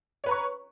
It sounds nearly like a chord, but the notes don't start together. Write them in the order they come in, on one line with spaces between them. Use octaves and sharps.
C#5 B4 A#5 C#6